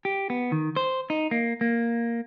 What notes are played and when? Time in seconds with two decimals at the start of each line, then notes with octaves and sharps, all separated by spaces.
0.05 G4
0.30 B3
0.52 D#3
0.76 C5
1.10 D#4
1.31 A#3
1.61 A#3